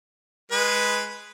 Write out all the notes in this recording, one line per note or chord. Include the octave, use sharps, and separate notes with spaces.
G#3 B4